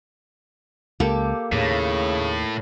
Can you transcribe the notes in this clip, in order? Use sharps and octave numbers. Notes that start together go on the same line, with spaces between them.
C#2 A#3 G4 A4
D#2 A2 C#3